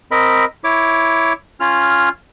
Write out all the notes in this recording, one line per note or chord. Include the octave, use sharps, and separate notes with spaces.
C4 A#4 D#5 B5
E4 C#5 D6
C#4 F4 F6